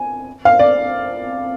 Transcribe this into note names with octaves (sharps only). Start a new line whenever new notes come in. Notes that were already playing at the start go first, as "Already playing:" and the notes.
Already playing: G#5
F5
D5